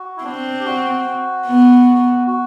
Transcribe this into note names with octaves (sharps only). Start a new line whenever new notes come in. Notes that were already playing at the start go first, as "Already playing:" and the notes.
Already playing: F#4
E4
C4 D4
G4
F#4
B3
F#4